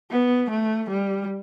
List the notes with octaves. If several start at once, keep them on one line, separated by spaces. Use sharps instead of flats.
B3
A3
G3